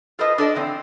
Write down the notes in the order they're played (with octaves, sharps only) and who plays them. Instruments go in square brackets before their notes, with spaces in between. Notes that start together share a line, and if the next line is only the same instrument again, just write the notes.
[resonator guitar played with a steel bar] F4 A4 B4 C5 D#5
D4 A4 D5 D#5
D3 E3 C4